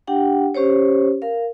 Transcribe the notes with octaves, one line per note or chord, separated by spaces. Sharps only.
D4 G4 F#5 G5
C#4 G4 C5 C#5
A#4 F5